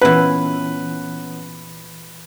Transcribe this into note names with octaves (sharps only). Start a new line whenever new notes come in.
A#2 E3 B3 C#4 B4 F#5